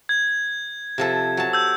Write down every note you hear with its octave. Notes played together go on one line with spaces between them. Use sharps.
G#6
C3 F3 A4
F#3 A5
E6 G6